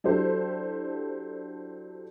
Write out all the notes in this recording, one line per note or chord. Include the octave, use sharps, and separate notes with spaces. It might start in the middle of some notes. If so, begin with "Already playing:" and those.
F#3 D4 E4 G4 A4 C5